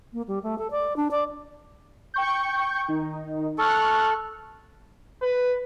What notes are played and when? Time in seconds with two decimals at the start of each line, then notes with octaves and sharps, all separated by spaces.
0.13 A#3
0.28 G3
0.43 A3
0.58 A4
0.71 D5
0.96 D4
1.11 D5
2.14 G5 C#6 G6
2.88 D#3 D#4
3.58 A4 C#6 F6 F#6
5.22 B4